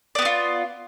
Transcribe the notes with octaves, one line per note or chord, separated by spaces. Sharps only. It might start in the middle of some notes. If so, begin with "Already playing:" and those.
B3 F4 F#4 D5